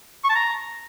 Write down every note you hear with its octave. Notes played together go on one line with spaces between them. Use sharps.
C#6
A5
A#5